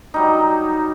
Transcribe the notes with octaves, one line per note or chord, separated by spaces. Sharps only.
F#3 G3 D#4